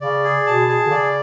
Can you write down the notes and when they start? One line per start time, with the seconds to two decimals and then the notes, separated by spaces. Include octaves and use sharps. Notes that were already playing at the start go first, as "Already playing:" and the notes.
0.01 C#3 D5
0.24 G#4
0.47 B2 A5
0.69 G#4
0.86 D3
0.90 C#3 D5